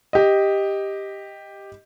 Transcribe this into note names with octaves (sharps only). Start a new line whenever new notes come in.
G4 D#5